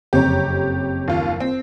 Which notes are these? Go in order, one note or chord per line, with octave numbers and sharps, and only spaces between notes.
F#1 F2 G4 C#5 A#5
D#2 F4
C4